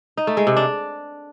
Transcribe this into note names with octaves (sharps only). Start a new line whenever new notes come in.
D#4
A3
G#3
C3
D4